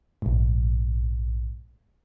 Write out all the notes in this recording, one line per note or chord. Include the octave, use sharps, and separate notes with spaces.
A#1 G#2